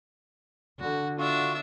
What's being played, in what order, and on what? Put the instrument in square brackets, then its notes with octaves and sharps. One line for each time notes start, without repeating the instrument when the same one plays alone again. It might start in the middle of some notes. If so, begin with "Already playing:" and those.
[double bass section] D3 [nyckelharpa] F#4
[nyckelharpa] D4 E5 [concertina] F4 F#4